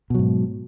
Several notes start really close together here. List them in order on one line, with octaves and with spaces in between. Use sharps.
B2 F#3 G#2